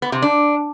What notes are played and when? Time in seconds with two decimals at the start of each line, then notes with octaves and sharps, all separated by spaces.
0.02 B3
0.12 C3
0.22 D4